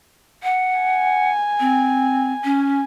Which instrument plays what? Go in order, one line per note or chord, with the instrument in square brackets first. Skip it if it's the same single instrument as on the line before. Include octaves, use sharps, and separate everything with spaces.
[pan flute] F#5
[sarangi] G#5
[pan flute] C4
C#4